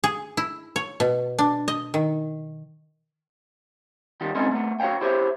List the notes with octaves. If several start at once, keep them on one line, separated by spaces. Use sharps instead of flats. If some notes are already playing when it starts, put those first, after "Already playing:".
G#4
E4
C#5
B2
D4
D#5
D#3
D#3 G3 D#4
G#3 C4 C#4 D#4 E4 A4
A3 B3
F#4 C#5 E5 F5 G5
E4 G4 C5 C#5 E5